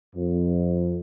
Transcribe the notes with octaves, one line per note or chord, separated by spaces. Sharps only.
F2